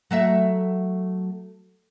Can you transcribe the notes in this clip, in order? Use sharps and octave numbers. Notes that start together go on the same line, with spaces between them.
F#3 A3 E5